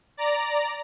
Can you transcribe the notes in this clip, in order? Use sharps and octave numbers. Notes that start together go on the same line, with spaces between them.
D5 A#5